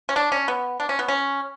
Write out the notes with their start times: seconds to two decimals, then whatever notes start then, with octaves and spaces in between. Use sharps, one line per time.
0.09 C#4
0.16 D4
0.32 C#4
0.48 B3
0.80 D4
0.89 C#4
0.99 B3
1.08 C#4